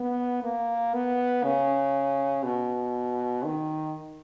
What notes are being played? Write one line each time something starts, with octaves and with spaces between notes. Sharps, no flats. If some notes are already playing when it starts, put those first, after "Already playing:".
Already playing: B3
A#3
B3
C#3
B2
D#3